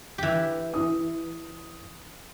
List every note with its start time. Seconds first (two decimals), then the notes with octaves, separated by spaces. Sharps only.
0.18 E3 G4
0.74 E4 D#6